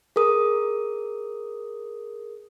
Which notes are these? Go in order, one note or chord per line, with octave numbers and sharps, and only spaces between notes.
G#4 A#4 D#6